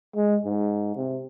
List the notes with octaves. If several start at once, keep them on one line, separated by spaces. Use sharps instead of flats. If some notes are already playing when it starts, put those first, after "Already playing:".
G#3
G#2
C3